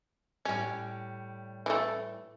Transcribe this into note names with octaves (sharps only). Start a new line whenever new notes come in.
A2 G3 C#4
E3 G#3 A3